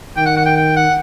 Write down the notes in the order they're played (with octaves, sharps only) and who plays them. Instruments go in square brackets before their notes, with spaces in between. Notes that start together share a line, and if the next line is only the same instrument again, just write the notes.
[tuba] D#3 [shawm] G5
[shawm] F#5
F#5
G5
G5
F#5